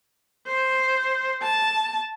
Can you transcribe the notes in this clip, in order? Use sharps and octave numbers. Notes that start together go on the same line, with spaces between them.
C5
A5